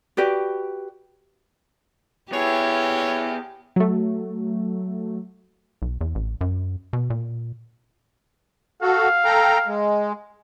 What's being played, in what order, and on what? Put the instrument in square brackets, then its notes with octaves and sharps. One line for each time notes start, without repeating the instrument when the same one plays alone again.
[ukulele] F#4 G4 B4 D5
[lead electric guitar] B3 G#4 [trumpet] E4 [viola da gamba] G4 [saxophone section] C#5
[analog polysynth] F#3 A3
[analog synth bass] B1
E2
A1
F#2
B2
A#2
[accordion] F#4 A4 [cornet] F5
[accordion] A4 G5 A#5
G#3